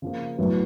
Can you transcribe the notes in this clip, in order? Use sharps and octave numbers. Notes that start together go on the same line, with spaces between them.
C#3 F3 A#3
A2 F#3 B3 E4